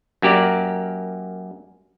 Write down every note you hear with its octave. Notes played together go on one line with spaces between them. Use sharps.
F#2 A#3 G4 A#4 D5